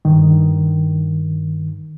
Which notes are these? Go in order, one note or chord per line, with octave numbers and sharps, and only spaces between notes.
G2 D#3